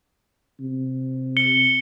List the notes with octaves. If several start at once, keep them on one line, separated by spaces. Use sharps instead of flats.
C3
C#7 G7